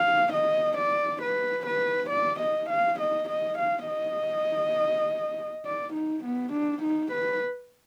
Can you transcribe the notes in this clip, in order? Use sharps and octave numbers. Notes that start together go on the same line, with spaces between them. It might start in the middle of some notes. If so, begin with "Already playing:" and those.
Already playing: F5
D#5
D5
B4
B4
D5
D#5
F5
D#5
D#5
F5
D#5
D5
D#4
B3
D4
D#4
B4